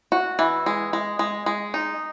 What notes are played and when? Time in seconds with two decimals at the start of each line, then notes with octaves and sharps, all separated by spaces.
0.12 F#4
0.39 E3
0.66 G#3
0.93 G#3
1.19 G#3
1.46 G#3
1.74 D#4